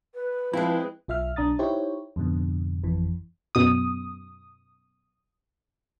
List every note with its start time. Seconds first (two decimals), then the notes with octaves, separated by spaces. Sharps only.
0.14 B4
0.53 F3 G#3 C4 E4
1.08 B1 F4 E5 F5 F6
1.36 B1 D4 A#5 D#6 A6
1.59 D#4 E4 G4 C5 C#5
2.16 F2 G#2 B2 D3
2.83 G#1 F2 E3
3.55 F#2 B2 D#6